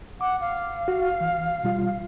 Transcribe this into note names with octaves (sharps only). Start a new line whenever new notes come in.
F#5 D6
F5
F#4
E3
B2 G3 F4